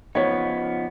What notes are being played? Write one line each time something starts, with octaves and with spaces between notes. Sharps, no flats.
C#3 F3 B3 D#4 C#5